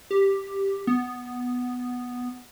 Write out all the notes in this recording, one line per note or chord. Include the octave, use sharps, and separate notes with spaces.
G4
B3